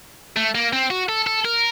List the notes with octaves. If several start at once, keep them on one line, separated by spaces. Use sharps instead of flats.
A3
A#3
C4
F#4
A4
A4
A#4